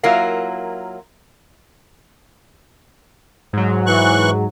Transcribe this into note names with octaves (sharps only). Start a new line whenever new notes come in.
F#3 A#3 E4 F4 A#4 F5
G#2 F#3
E3 C#6 F#6